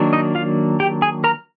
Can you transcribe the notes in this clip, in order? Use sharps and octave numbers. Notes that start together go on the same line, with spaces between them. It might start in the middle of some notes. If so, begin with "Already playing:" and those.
Already playing: D#3 F#3 A#3 D4
D#4 D#5
F4 F5
G4 G5
G#4 G#5
A#4 A#5